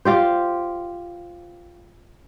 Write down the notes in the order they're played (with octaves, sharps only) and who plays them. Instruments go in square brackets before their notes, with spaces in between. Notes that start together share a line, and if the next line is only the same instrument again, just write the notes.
[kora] F4 G4 C5